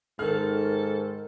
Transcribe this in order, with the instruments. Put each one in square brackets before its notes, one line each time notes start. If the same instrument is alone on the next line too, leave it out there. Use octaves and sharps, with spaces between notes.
[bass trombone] G#2 [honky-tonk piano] D#3 F6 [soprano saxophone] A4